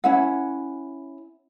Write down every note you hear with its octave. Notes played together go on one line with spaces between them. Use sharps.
C#4 E4 F#5